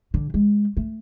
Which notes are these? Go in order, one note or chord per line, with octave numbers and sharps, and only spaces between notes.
D3
G#3
A3